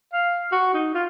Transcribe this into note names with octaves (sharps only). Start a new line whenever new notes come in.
F5
F#4
D#4
F4